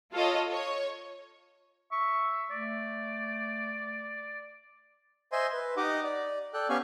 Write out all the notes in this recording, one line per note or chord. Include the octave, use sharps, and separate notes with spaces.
F4 A4 C#5 D#5
C#5
E5 C#6
A3 D5
C5 D#5 E5 G#5 C6
B4
D#4 G4 D#5 F#5 D6
D5
A4 D5 G5 F#6
B3 C#4 G4 F5 G#5 C#6